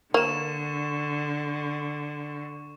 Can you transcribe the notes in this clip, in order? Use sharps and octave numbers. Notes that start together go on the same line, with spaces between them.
D3 A#3 C#6 E7